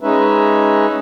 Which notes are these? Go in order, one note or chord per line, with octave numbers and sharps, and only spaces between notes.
G#3 C#4 D#4 B4 E5